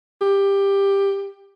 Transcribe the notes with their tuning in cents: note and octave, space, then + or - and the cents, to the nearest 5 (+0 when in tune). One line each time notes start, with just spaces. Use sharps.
G4 +15